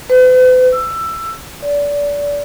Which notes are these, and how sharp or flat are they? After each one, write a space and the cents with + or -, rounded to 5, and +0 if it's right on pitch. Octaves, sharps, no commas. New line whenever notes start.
B4 +45
E6 +15
D5 -25